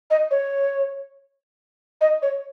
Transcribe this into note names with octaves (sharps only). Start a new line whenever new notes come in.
D#5
C#5
D#5
C#5